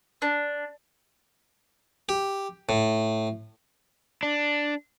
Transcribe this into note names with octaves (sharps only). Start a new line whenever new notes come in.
D4
G4
A2
D4